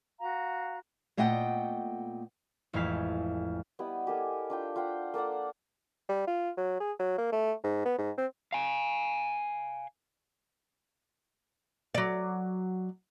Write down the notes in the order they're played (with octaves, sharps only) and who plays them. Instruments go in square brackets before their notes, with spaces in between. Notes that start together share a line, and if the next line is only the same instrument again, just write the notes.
[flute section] F#4 F5 A#5
[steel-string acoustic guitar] A#2 A3 B3 D#5 F#5 G5
[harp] A1 F2 G#3 E4 F5 B6
[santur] G3 B3 E4 D#5
G4 A4 A#4 G#5
D4 F4 G5
F4 C5 F#5 G5
A#3 A4 D5 F#5
[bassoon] G3
F4
F#3
G#4
F#3
A#3
A3
G#2
B3
G#2
C4
[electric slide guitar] F5 G#5
[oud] F#3 D5